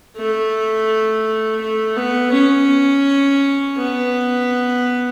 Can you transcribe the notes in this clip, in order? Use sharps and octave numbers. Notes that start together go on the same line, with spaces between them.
A3
A3
B3
C#4
B3